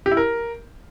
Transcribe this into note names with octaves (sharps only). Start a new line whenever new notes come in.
G4
E4
A#4